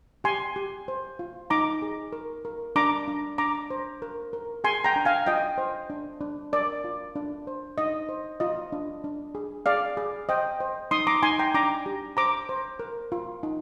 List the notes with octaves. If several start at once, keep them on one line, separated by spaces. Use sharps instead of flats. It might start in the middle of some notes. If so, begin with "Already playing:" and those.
G4 G#5 C6
G4
C5
F4
D#4 A#5 D6
G#4
A#4
A#4
D4 A#5 D6
D4
D4 A#5 D6
C5
A#4
A#4
G#4 G#5 C6
G5 A#5
D4
F5 G#5
F4 D#5 G5
C5
D4
D4
A#4 D5
F4
D4
C5
D#4 D#5
C5
F4 D#5
D4
D4
G#4
G#4 D5 F5
G#4
C5 D#5 G5
C5
D#4 C6 D#6
A#5 D6
D#4 G#5 C6
G5 A#5
D4 A#5 D6
G4
C5 A#5 D6
C5
A#4
F4
D#4